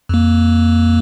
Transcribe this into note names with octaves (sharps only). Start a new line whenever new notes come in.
F2 A#3